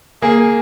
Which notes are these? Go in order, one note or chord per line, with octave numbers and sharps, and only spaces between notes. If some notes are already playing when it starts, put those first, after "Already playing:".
A#3 G#4